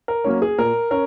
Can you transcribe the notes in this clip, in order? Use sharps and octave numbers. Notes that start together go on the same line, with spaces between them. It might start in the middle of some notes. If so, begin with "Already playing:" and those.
A#4
F#3 A#3 C#4
G#4
A#2 A#4
C#4 A#4